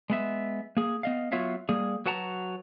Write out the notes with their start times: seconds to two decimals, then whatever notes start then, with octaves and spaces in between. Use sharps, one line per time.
0.10 G#3 B3 E5
0.77 A#3 G#4
1.03 B3 D#5 F5
1.32 F#3 B3 F4 C#5 E5 F5
1.69 G3 A#3 G#4
2.06 F#3 F#4 B4 F#5 A5 A#5